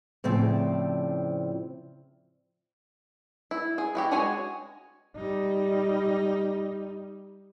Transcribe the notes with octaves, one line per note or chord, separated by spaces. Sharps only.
A2 C#3 F3 C4 D5
E4
G#4
E4 F#4 G4
G#3 F#4 G#4 C#5 G#5
G3 D#4